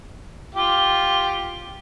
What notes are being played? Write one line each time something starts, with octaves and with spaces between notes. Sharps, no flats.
F4 G4